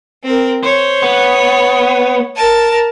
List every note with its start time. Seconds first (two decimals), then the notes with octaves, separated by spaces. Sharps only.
0.23 C4 A#4
0.63 C5 C#5
1.02 B3
2.36 A#4 A5